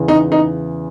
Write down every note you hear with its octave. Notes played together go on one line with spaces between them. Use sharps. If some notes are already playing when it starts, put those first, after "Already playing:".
Already playing: E2 C#3 E3
D#4
D#4